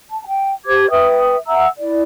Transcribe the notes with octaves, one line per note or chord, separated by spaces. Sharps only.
A5
G5
G4 C5 D6 G#6
B4 E5 G5 D#6
E5 F#5 A#5 E6
E4 D5